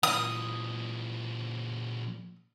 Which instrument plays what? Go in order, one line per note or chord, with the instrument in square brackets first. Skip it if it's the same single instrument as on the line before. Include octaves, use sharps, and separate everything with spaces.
[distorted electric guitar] A#2 E3 [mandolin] D#6